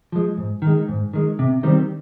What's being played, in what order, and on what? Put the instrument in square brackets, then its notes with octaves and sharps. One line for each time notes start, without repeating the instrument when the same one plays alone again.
[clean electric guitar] F3 G#3
G#2
D#3
G#3
G#2
D#3 G#3
C3
D#3 G3 C4